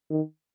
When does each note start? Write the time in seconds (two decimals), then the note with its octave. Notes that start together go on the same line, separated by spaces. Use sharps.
0.10 D#3